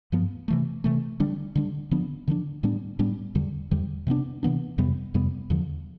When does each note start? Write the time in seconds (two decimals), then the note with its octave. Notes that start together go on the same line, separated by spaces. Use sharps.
0.12 G2 F3 B3
0.48 C3 E3 A3
0.84 C3 E3 A3
1.20 D3 G3 D4
1.55 D3 G3 D4
1.91 D3 F3 B3 D4
2.28 D3 F3 B3 D4
2.63 A2 G3 B3 D4
2.99 A2 G3 B3 D4
3.35 E2 D3 G3
3.71 E2 D3 G3
4.07 C3 E3 B3 D4
4.43 C3 E3 B3 D4
4.78 F2 C3 G3 B3
5.14 F2 C3 G3 B3
5.50 E2 D3 F3